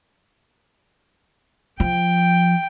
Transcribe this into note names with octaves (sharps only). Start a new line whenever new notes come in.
F3 G5